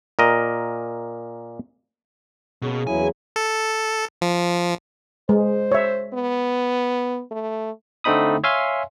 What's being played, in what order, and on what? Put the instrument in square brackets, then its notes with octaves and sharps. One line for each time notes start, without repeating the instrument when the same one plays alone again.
[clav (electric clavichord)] A#2 A#4 D#5
[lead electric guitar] B2 [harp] A#3 C#4 G#4
[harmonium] E2 F#3 E4 [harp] G#4 [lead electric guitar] G#5
[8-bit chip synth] A4
F3
[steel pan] G#3 [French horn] C5
[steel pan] C#5 E5
[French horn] B3
A3
[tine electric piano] D3 A3 C4 D#4 B5 D#6
C#5 E5 F5 G#5 C6